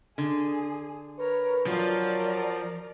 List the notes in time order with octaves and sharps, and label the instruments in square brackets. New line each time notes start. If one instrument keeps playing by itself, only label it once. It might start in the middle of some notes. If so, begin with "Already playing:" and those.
[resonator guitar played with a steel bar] D3 [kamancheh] G#4
[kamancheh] A#4 C#5 [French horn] B4
[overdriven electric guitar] F3 [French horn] F#3 [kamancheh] A#4 D5